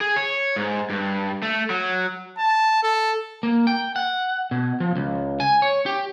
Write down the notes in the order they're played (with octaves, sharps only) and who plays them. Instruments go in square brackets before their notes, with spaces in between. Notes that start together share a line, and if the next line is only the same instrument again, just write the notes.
[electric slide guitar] G#4
C#5
G#2
G2
A3
F#3
[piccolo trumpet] A5
A4
[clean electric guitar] A#3
G5
F#5
B2
F3
C#2
G#5
C#5
G4